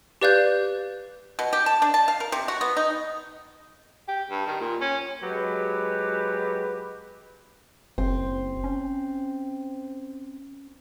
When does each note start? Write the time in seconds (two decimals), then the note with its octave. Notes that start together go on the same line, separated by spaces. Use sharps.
0.21 G4 B4 D5 F5 F#6 G6
1.39 B2
1.53 G4
1.66 A5
1.82 D4
1.94 A5
2.08 F5
2.20 A#4
2.32 C3
2.48 F#4
2.61 B3
2.77 D#4
4.08 G4
4.30 G2
4.47 D#3
4.60 A#2
4.81 C#4
5.23 F#3 G#3 G4 B4
7.98 F#1 C4
8.64 C#4